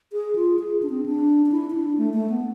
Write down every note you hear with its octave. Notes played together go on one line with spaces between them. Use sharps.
G#4
F4
G#4
D4
C4
D4
D4
E4
E4
D4
A3
A3
B3